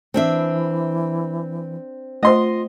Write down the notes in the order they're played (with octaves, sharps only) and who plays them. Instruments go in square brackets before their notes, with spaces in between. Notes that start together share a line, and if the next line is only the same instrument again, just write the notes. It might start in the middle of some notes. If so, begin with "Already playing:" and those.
[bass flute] E3 [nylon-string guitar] C4 D4 E5
[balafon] A3 C5 [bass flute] F4 [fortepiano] D#5 C6